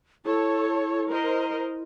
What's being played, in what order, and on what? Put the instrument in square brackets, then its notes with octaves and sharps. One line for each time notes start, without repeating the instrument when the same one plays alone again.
[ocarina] E4 [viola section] A4 C#5
[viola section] A#4 C5 D#5